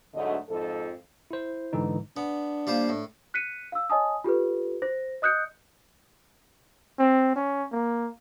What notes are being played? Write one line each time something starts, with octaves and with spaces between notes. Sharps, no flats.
D2 G#2 D3 F#3 A3 D#5
F2 G#2 F3 A4
E4 C5
G#2 D3 E3 D#4
B3 D4
G3 A#3 F4 C5
A2
F#6 B6 C#7 D#7
F5 E6
C#5 D#5 G#5 A5 D#6
F4 G4 A4 B4
C5 A#6
D#5 D#6 F#6 G6 C#7
C4
C#4
A#3